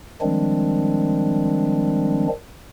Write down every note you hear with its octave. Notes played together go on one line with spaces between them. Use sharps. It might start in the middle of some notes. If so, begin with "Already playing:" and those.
D#3 F3 G3 G#3 C4 D4